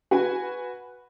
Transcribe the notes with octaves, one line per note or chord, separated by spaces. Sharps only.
F#4 B4 G#5